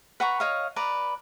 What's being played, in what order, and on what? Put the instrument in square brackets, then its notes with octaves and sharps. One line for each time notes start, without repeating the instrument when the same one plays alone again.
[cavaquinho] B4 F#5 A#5 C#6
C#5 D#5 F5
B4 D5 A#5